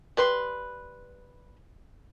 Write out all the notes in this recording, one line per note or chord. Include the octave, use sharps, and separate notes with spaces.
G3 B4 C6